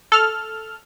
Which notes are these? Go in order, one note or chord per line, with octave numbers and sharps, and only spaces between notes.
A4 F6